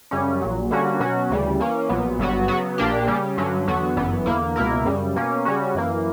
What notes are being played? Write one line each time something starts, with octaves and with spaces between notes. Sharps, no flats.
F#2 C#3 G3 C#4
A#1 A#2 F#3
D3 G3 A#3 C#4 F#4
B2 F#3 C#4 F#4
D2 C#3 E3 G3
E3 A#3 C#4
A#1 A#2 F#3 B3
G1 G2 F#3 B3 F#4
C#3 F#3 B3 F#4
A#1 A#2 A#3 D4 G4
C#3 G3 A#3 C#4 G4
G2 D3 F#3 C#4
E2 D3 F#3 B3 F#4
G1 F#2 E3 B3
E2 D3 A#3 E4
C#2 B2 A#3 E4 A#4
F#2 C#3 G3
B2 A#3 C#4
C#3 G3 C#4 F#4
F#2 E3 A#3